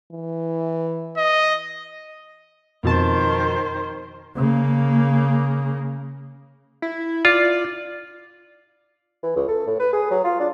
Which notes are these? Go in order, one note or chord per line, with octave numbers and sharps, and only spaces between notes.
E3
D#5
F2 B2 D#3 C5 A5
C#3 A#3
E4
F4 D5
E3
C#2
A4
A2
B4
G#4
F#3
F4
D4